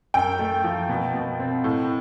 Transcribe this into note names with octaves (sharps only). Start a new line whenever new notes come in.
F#2 G5
A3
F3
B2
B2
C4
A2